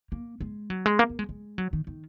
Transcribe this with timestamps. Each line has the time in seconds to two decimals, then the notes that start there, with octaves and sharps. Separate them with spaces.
0.12 A#3
0.41 G#3
0.70 F#3
0.86 G#3
0.99 A#3
1.09 A#3
1.19 G#3
1.29 G#3
1.58 F#3
1.73 D#3
1.87 D#3